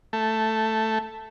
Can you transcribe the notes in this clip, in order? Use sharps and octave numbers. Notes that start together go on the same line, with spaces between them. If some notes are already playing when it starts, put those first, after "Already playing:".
A3